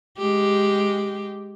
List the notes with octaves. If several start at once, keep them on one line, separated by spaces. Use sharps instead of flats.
G#3 G4